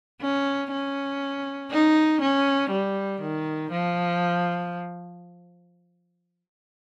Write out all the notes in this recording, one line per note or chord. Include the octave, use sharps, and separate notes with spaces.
C#4
C#4
D#4
C#4
G3
D#3
F3